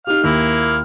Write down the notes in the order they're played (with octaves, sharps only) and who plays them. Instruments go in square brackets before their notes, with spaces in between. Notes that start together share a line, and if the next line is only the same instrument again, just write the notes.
[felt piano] D#4 G4 [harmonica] F5
[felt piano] D#2 [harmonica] A#3 E4 F5